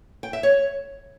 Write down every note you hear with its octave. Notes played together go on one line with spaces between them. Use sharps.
G5
E5
C#5